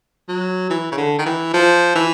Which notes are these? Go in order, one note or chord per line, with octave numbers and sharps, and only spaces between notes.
F#3
E3
C#3
D3
D#3
E3
F3
E3